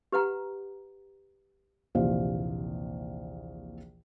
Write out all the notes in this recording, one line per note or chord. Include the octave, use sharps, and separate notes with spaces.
G4 B4 F#5 A#5
A#1 D#2 C3 E3 C5 F5